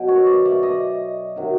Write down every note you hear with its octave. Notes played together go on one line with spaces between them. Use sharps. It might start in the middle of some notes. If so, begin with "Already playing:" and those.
Already playing: B2 F#3
C#5
D5
E5
D#5
C3 D#3 F#3